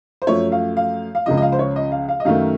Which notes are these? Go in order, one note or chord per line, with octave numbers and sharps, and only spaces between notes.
C5
F#2 F3 A3 C#5
F5
F5
F5
C#2 C#3 F3 D#5
D#5
F5
C5
C#5
D#5
F5
F5
D#5
F#2 D#3 A3 F5